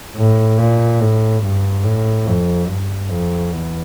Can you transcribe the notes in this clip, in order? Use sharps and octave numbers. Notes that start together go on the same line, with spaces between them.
A2
A#2
A2
G2
A2
F2
G2
F2
E2